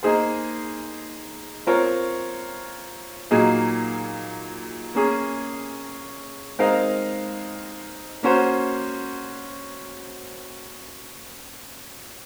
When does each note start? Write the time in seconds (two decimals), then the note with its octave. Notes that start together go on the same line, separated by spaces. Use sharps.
0.03 A#3 D#4 G#4 C5
1.67 C4 F4 A#4 C#5
3.31 A#2 F#3 A#3 D#4 G#4
4.95 A#3 C#4 G#4
6.59 G#3 C4 D#4 A#4 F5
8.23 A#3 C#4 F#4 C5